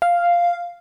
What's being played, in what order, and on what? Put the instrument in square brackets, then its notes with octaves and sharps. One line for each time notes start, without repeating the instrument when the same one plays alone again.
[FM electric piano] F5